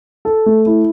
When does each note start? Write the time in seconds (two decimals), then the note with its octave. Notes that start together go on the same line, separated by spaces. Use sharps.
0.25 A4
0.46 A3
0.66 E4